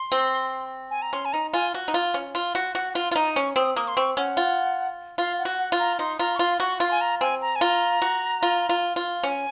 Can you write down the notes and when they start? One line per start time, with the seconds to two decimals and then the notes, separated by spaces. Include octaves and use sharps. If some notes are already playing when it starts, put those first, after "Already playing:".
Already playing: C6
0.12 C4
0.91 G#5
1.02 A#5
1.13 C#4 C6
1.25 G#5
1.33 D#4 A#5
1.53 F4 G#5
1.74 F#4
1.88 D#4
1.94 F4
2.14 C#4
2.35 F4
2.55 F#4
2.75 F#4 F#5
2.95 F4 C6
3.11 F4
3.16 D#4 A#5
3.36 C#4 C#6
3.56 C4 D#6
3.76 A#3 D#6
3.88 C6
3.97 C4 C#6
4.17 C#4 F#5
4.37 F4
5.18 F4 F5
5.39 F#5
5.45 F#4
5.59 F#5
5.72 F4
5.79 A#5
5.99 D#4 C6
6.19 F4 A#5
6.35 C#6
6.39 F4 C6
6.60 F#4 C#6
6.80 F4 C6
6.91 G#5
7.01 A#5
7.21 C4 G#5
7.41 A#5
7.56 G#5
7.61 F4 A#5
8.02 F#4
8.43 F4
8.69 F4
8.96 F4
9.23 C#4 G#5